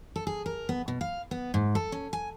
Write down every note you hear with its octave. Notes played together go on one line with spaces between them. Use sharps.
A4
G#4
A#4
B3
B2
F5
B3
G#2
A4
C#4
G#5